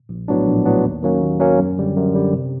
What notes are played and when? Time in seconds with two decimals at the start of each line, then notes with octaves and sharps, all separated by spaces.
0.09 A#1
0.28 A2 F#3 B3 D4
0.47 A#1
0.65 A2 F#3 B3 D4
0.84 D#2
1.03 D#3 F#3 A#3 C#4
1.22 D#2
1.40 D#3 F#3 A#3 C#4
1.59 F#2
1.78 D3 G3
1.96 F#2
2.14 D3 G3
2.33 C3